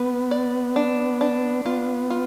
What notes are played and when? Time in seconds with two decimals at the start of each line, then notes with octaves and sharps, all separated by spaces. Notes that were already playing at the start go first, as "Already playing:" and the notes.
Already playing: B3 B4
0.31 D5
0.76 D4
1.21 D4
1.65 B3 F4
2.10 F4